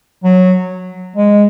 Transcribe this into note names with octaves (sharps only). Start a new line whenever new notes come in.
F#3
G#3